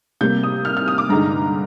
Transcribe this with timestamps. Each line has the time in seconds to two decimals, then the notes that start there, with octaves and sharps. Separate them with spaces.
0.21 C3 G3 A#3 G6
0.43 D#6
0.65 F6
0.77 F6
0.88 D#6
0.98 D6
1.10 G2 D3 G#3 D#4 A#5